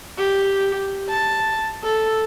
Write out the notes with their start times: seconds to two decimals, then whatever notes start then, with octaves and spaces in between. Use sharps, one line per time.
0.18 G4
1.09 A5
1.84 A4